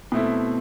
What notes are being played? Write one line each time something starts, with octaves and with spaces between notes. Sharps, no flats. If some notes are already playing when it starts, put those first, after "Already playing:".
B2 A3 C4 E4